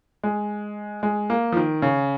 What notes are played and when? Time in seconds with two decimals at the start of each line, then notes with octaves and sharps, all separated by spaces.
0.23 G#3
1.03 G#3
1.30 A#3
1.52 F3
1.57 D#3
1.82 C#3